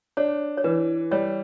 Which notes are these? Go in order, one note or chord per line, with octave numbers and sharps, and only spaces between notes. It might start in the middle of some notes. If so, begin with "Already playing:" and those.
D4 C#5
C#5
E3 B4
G3 C#5